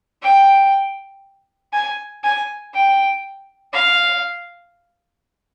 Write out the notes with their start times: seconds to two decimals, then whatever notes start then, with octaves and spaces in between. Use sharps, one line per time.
0.22 G5
1.72 G#5
2.24 G#5
2.74 G5
3.73 F5